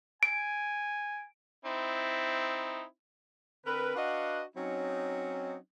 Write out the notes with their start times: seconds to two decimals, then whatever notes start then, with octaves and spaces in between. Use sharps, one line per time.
0.23 G#5 D7
1.65 C4 D#4 E4
3.65 D3 C4 A#4 B4
3.95 D4 F#4 B4 D#5 F5 F#5
4.56 F#3 C4 C#4 D#4